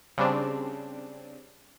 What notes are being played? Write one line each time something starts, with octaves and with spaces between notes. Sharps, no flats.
C#3 G3 C4 D4